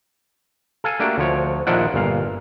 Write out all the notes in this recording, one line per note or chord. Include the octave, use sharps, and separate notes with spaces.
A4 F5 G#5
A3 A#3 D4 F#4 G4
D2 F3 C#5
A#1 D#3 F3 D4 E4 F#5
G1 A#2 F5